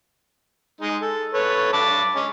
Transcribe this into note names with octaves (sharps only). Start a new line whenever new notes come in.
G#3 D#4
A4
A4 B4 C#5
A5 B5 D6
G#3 C#4